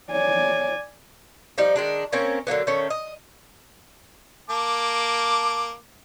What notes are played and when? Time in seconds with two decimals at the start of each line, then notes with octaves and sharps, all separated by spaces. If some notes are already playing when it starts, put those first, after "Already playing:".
0.11 C#5 D5 G#5
1.58 F3 G3 D#4
1.76 D#3 G#3 D4
2.12 A#3 C4 C#4 A#4
2.47 D3 F#3 A#3 B3
2.67 D#3 A3 C#4
2.90 D#5
4.50 A#3 A5 D6